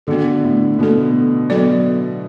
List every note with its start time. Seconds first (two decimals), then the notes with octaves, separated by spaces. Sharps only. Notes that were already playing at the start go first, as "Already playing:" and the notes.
0.07 D3 B3 F#4 A4
0.43 A2
0.79 B2 B3 F#4 A4
1.50 F#3 B3 F#4 A4 D5